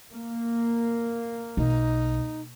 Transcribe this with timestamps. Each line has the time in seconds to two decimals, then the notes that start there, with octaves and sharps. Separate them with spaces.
0.12 A#3
1.57 B1 D#4